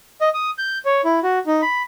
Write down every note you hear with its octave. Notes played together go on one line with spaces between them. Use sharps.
D#5
D#6
G6
C#5
E4
F#4
D#4
B5